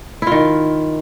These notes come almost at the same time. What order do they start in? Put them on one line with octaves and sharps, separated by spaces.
E4 F4 D#3